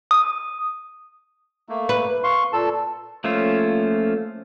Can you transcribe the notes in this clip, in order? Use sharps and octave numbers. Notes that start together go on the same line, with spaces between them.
D#6
A3 A#3
B4
F5 C6 C#6
A#2 A4 A5
F3 A3 A#3 C#4 F4